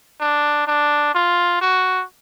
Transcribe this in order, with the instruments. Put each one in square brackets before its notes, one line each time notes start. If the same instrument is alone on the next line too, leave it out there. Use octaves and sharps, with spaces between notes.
[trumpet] D4
D4
F4
F#4